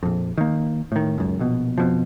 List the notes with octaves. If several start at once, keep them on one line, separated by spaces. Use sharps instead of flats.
A#1 F2
D#3 A#3
A2 D#3
C#2 F#2
A#1 B2
F2 B2 F3